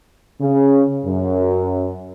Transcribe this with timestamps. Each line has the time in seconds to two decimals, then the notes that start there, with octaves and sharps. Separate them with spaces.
0.41 C#3
1.05 F#2